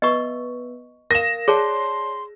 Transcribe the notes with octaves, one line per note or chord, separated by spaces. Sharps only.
B3 B4 D#5 C#6
A#4 F5 A#6 E7
G#4 C#5 D5 A5 C6